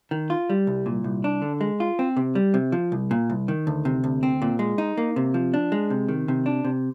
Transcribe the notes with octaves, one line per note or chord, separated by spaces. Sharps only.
D#3
F4
G3
C2
A#2
C2
D4
D3
G#3
F4
C4
C3
G3
C3
F3
C2
A#2
C2
D#3
D2
C3
D2
C4
A#2
G#3
D#4
A#3
C3
F3
D4
G#3
C3
D#3
C3
D4
C3